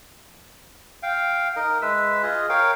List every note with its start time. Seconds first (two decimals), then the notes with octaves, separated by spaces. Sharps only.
1.03 F5 G5
1.56 D#4 A#4 D#5
1.82 G#3 B4 E5 E6
2.23 F4 G#4 D#5
2.49 A#4 C#5 F5 G5